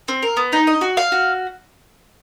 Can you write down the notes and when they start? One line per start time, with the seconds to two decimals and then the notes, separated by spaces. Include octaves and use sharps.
0.08 C4
0.22 A#4
0.37 B3
0.53 D#4
0.67 D#5
0.81 F#4
0.97 F5
1.12 F#4